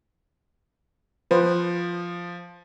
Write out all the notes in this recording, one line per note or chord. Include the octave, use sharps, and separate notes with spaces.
F3 B4 C5